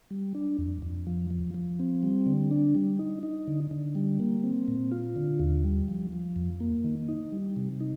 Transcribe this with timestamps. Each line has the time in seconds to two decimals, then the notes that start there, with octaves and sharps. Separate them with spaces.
0.11 G3
0.35 D4
0.59 F2
0.82 F2
1.07 F3
1.30 F3
1.54 F3
1.79 C4
2.03 G3
2.26 D3
2.51 D4
2.75 G3
2.99 D#4
3.23 D#4
3.47 D3
3.71 D3
3.95 G3
4.20 A#3
4.44 C4
4.68 A#2
4.91 F4
5.16 D3
5.39 D#2
5.64 G3
5.88 F3
6.12 F3
6.36 F2
6.60 A#3
6.84 D#3
7.08 D#4
7.32 G3
7.56 C3
7.80 D#4